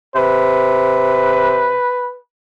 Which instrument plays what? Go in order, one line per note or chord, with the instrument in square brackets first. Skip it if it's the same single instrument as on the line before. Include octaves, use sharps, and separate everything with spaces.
[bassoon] C3 [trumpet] B4